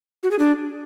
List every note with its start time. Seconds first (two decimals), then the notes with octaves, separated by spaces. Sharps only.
0.23 F#4
0.31 G#4
0.39 D4